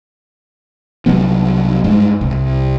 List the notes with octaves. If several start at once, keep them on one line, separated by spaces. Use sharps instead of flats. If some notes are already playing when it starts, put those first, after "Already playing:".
C2 F#3 B3
G2 G#3
C2